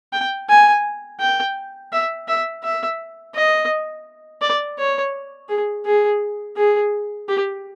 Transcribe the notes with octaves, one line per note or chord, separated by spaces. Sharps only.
G5
G#5
G5
E5
E5
E5
D#5
D5
C#5
G#4
G#4
G#4
G4